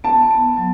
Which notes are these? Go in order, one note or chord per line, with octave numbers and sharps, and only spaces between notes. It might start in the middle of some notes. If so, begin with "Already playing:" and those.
B3 A5
B3
F#3